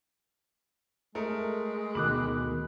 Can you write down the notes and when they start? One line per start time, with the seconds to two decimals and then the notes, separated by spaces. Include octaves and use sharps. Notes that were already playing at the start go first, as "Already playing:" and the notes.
1.15 G#3 A3 A#4
1.95 D2 B2 D#3 B5 D6 F#6